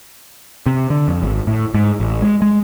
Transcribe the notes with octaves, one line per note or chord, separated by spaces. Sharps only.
C3
D3
F2
G#1
A2
G#2
A1
G#3
G#3